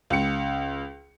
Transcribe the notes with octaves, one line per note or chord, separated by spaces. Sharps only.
C#2 C#7